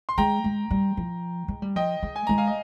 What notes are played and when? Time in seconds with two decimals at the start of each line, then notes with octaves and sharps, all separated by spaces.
0.09 C6
0.18 G#3 G5 A#5
0.44 G#3
0.70 G3
0.97 F3
1.48 G#3
1.62 G3
1.76 F3 D#5 G5
2.03 G#3
2.16 G#5
2.27 G#3 A#5
2.38 F5 G#5
2.47 D#5